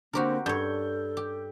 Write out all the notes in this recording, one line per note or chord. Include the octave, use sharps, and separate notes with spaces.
D3 A#3 C4 F#4 G4 A#4
G2 A4 C#5 G6
G4